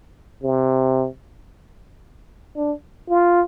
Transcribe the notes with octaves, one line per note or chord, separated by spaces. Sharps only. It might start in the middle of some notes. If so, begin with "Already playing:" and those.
C3
D4
F4